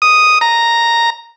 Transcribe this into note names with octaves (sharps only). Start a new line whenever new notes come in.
D#6
A#5